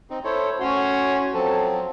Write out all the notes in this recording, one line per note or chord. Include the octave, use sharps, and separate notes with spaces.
C4 D#4
E4 A4 C5 C#5
A2 C#4 F#4 C6
F3 F#3 C4 A4